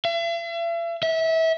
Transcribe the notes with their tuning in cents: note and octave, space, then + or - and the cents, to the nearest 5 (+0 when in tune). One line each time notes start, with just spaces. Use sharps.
E5 +45
E5 -25